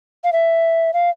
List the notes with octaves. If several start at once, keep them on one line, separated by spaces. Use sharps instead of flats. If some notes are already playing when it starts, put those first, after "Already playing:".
F5
E5
F5